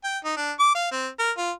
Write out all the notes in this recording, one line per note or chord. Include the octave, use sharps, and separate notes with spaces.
G5
D#4
D4
D6
F5
C4
A#4
F4